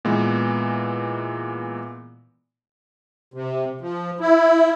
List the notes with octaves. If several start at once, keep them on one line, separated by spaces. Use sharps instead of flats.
A#2 E3 G#3 B3
C3
F3
E4